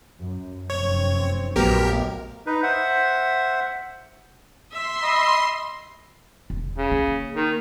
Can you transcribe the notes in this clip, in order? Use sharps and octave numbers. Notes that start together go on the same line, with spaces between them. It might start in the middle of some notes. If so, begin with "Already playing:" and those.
F#2
F1 F#2 C4 C#5
A#1 F#3 A3 B3 G4 A#4
D#4 B4
C5 E5 F#5
E5 C6
D#5 B5
E1
C#3
A#3
D#3